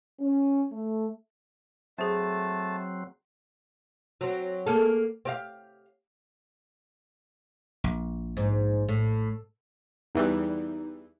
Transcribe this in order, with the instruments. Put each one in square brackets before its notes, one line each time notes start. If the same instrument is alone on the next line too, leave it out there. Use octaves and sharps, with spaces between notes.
[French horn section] C#4
A3
[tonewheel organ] F#3 C4 [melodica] A3 A5 [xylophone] G#4 C5
[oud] F#3 C4
A#3 G#4 A4
C4 G4 F5
[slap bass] A#1
[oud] G#2
A2
[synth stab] E2 E3 G3 [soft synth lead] D#4